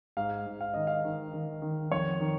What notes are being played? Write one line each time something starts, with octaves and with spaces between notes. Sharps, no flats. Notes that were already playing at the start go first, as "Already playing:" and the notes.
G#2 F5
G#2
F5
D#3 D#5
F5
D#3
D#3
D#3
F2 C#5
D#3